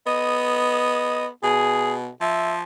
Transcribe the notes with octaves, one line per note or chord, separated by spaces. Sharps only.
B3 D#5
B2 G#4
F3 E5